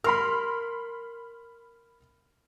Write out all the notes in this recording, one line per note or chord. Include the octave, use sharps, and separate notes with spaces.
A#4 B5 C6 F6